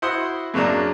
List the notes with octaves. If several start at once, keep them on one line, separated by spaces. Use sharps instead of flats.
E4 F#4 C5 F#5 C6 D#6
F#2 C#3 F#3 A#3 D4